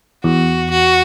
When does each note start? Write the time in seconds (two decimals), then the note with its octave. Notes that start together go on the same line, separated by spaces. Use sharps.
0.24 E2 F#4
0.71 F#4